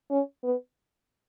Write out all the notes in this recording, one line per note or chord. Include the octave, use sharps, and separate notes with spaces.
C#4
B3